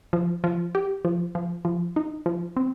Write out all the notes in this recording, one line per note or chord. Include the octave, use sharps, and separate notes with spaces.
F3
F3
G4
F3
F3
F3
D#4
F3
C4